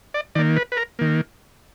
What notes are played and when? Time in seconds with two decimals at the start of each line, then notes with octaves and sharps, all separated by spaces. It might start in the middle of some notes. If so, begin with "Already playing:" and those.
0.14 D5
0.35 D#3 A#3 D5
0.56 B4
0.72 B4
0.77 A#4
0.99 D#3 A#3